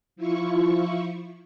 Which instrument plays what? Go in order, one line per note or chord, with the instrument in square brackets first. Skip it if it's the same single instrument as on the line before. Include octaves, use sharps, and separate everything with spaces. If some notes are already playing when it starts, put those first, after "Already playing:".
[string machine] F3 E4 F4 C#6